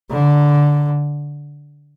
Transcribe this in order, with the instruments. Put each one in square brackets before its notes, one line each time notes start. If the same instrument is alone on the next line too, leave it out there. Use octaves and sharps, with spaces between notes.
[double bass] D3